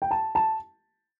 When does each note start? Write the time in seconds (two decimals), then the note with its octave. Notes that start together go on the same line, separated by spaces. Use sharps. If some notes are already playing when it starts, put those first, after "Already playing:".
0.02 G5
0.11 A5
0.35 A5